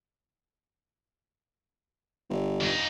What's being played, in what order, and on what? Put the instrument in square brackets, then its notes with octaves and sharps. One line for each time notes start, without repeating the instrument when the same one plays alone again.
[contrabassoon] G1
[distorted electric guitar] F2 D#4